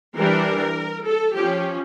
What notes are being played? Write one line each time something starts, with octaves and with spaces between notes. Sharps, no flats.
E3 G3 D4 A#4
A4
F3 C#4 G4